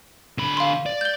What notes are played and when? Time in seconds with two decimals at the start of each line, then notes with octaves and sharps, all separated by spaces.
0.38 D3 B5
0.57 F5 C6
0.86 D5
1.01 G6 G7